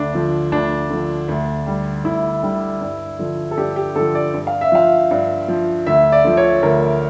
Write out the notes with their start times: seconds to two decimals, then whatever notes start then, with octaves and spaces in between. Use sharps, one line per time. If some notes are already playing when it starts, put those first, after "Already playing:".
Already playing: D2 D4
0.14 D3 F3
0.52 D2 D4
0.90 D3 F3
1.28 D2
1.67 D3 G3
2.04 D2 E4
2.43 D3 G3
2.81 G2
3.19 D3 F3
3.51 A4
3.57 G2 G4
3.76 G4
3.95 D3 F3 A4
4.15 D5
4.34 G2
4.47 F5
4.61 E5
4.72 F3 F5
5.11 G2
5.48 F3
5.86 D2 E5
6.12 D5
6.24 D3 F3
6.37 C#5
6.63 D2 A#4